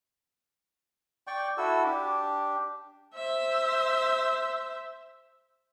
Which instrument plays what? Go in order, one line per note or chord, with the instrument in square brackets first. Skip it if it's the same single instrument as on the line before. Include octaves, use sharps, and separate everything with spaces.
[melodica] D5 G5 C#6
E4 F#4 A4 E6
D4 G4
[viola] C5 E5